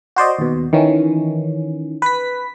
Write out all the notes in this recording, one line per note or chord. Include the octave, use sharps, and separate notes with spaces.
F#4 C5 D5 D#5
D#2 B2
D#3 E3 C#4
B4 B6